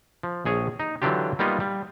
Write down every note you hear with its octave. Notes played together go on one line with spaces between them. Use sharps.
F3
A#1 G#4 C#5
D#4
D3 E3 F#3 D4 F4 G4
G3 A#3 B3 D#4 F4
G3